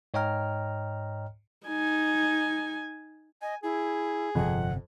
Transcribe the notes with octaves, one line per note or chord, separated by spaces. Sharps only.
G#2 C#5 D#5 G5 A#5 F6
D#4 G#5
D#5 G#5
E4 G#4
G1 F2 C3 F#5